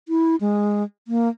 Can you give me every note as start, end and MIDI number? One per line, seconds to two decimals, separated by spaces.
0.08 0.36 64
0.40 0.83 56
1.08 1.29 58